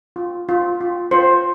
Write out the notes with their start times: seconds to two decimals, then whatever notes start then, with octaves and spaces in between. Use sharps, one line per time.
0.16 F4
0.49 F4
0.81 F4
1.11 F4 C5